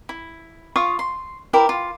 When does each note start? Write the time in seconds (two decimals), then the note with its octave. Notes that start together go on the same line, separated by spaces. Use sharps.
0.09 E4
0.76 F4 F5 C#6 D#6
0.99 C6
1.53 E4 G4 A#4
1.69 F4